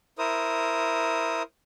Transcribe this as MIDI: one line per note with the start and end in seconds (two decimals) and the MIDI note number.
0.18 1.43 64
0.18 1.43 70
0.18 1.43 72
0.18 1.43 87